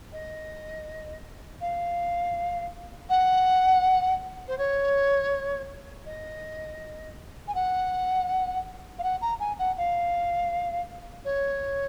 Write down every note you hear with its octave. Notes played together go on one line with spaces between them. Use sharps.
D#5
F5
F#5
C5
C#5
D#5
G#5
F#5
F5
F#5
A#5
G#5
F#5
F5
C#5